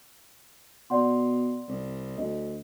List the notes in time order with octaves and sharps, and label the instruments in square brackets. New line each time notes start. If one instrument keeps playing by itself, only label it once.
[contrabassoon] B2 [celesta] D5 F#5 C6
[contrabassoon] C2
[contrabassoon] D2 [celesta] D#5